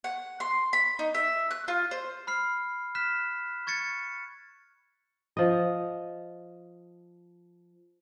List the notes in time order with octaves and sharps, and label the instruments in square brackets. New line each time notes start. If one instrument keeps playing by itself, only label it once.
[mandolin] F#5
C6
B5
D#4
E5
F#6
F4
C5
[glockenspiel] B5 F6 C7
F6 F#6 B6 E7
C#6 G#6 A6 C#7
[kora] F3 D#5